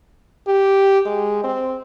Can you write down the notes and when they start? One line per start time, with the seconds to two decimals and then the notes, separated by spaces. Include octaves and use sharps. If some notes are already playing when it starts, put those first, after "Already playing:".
0.47 G4
1.06 G#3
1.44 C4